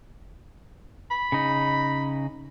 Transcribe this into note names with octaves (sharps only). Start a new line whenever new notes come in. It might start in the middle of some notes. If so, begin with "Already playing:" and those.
B5
C#3 D#4